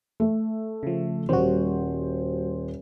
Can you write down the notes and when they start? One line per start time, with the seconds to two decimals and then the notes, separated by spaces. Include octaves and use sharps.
0.20 A3
0.83 C#3 F3
1.29 D#1 G3 F#4 C5